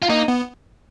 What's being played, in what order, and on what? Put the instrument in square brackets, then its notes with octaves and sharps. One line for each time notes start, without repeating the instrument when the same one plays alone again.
[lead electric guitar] F4
[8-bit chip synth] A#3 [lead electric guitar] D#4
[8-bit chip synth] B3